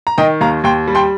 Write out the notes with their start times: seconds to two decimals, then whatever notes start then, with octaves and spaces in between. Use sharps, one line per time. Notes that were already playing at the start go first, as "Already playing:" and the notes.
0.07 A#5
0.18 D#3 D#5 G5
0.41 D#2 F5 A#5
0.64 D#2 G5 C6
0.88 G3
0.95 G5 C6